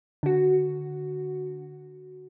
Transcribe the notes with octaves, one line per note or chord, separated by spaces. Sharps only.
D3 F#4